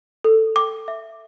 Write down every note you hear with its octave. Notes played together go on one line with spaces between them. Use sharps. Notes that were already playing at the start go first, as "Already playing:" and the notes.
A4
G5 D6
E5